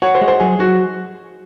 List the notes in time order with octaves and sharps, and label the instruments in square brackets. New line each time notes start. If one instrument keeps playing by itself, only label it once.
[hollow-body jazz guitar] F#4 [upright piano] C#5
[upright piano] C5
[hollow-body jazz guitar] G#3
[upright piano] C5
[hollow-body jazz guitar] F#3 [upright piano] G#4
[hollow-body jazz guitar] F#3 [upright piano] F#4